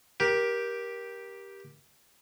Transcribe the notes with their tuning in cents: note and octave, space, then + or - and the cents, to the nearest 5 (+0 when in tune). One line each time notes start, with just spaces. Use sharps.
G4 +0 A#4 +20